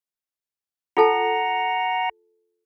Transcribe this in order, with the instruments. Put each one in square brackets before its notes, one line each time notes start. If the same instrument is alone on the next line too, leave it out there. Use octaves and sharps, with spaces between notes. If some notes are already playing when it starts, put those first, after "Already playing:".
[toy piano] F4 A4 A5 [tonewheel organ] F#5 A#5